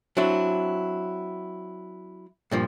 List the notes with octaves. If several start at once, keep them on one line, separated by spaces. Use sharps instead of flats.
F#3 C4 D4 E4
G2 A#2 F3